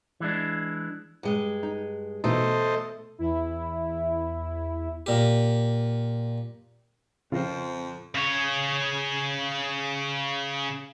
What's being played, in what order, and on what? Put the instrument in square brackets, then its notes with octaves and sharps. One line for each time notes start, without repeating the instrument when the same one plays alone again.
[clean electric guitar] E3 G#3 D4
[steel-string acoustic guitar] G2 G#3
[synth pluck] D#4
[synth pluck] B2 E3 D#4 [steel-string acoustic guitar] A3 [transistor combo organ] A4 C5 D#5
[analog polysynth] E2 E4
[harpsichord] A#2 G4
[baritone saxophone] F2 [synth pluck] C#3 [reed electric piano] F3 C4 [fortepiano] F4 A#4 C5
[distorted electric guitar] C#3 C#5